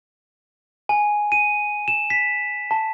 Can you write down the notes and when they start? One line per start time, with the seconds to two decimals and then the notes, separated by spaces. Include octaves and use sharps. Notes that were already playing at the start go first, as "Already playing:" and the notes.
0.89 G#5
1.32 D#7
1.88 E7
2.10 B6
2.71 A5